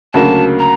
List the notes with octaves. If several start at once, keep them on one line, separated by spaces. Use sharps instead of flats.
D2 C#3 F#3 A#3 A5
A#5